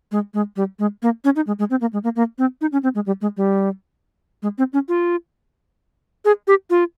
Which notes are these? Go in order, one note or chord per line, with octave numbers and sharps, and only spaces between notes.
G#3
G#3
G3
G#3
A#3
C#4
D#4
G#3
G#3
C4
A#3
G#3
A#3
A#3
C4
D#4
C#4
C4
G#3
G3
G#3
G3
G#3
C4
C#4
F4
G#4
G4
F4